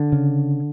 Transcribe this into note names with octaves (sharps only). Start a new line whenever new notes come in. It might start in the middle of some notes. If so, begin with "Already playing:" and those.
Already playing: D3
C#3